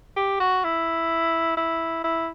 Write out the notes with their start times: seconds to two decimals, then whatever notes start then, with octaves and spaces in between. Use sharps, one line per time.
0.16 G4
0.40 F#4
0.64 E4
1.57 E4
2.04 E4